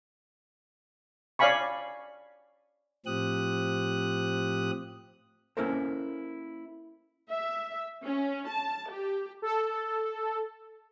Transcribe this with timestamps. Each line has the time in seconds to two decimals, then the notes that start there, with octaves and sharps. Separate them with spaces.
1.39 C#5 D5 F5 G#5 B5 C#6
3.06 A2 F3 C4 G4 D#6 F#6
5.57 A#3 C#4 E4 A4 A#4 C5
7.29 E5
8.04 C#4
8.47 A5
8.91 G4
9.42 A4